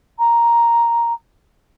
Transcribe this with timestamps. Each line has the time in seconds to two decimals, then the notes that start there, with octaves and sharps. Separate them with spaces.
0.19 A#5